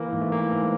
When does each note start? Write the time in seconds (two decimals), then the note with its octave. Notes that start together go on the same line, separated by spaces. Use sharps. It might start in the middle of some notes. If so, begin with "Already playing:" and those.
Already playing: E3 A#3
0.13 G#2
0.21 A3
0.32 E3 A#3
0.52 G#2